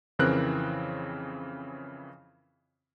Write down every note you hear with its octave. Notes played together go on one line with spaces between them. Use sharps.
F2 C#3 E3 C4 A#4 F#6